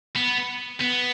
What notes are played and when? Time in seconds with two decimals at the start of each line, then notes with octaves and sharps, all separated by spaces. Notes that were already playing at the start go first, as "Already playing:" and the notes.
0.16 B3
0.81 B3